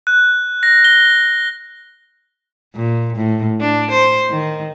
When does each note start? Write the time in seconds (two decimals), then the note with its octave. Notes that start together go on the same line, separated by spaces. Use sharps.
0.07 F#6
0.63 A#6
0.84 G7
2.75 A#2
3.16 A2
3.61 D4
3.91 C5
4.29 D#3